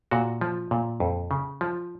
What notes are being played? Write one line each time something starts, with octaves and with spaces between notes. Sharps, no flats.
A#2 F#4
F3
A#2
F2
C#3
F3